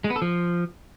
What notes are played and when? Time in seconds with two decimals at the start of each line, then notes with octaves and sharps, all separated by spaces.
0.04 G#3
0.10 B3
0.16 A4
0.22 F3